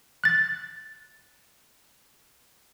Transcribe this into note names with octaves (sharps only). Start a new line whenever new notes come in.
F#6 A6